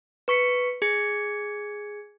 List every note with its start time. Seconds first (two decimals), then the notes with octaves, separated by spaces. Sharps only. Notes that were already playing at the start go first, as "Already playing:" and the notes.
0.28 B4 C#6 B6 C#7
0.82 G#4 G#6 C#7